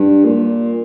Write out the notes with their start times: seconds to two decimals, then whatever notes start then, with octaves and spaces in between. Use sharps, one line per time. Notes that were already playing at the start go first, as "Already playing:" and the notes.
Already playing: G2
0.25 A#2